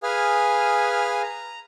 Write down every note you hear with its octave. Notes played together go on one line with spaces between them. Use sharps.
G#4 B4 F5 G#5 D#6 F6
A#5